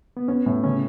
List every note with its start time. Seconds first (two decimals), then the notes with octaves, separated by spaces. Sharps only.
0.17 B3
0.28 B3 C#4
0.46 A2
0.64 C#3 C#4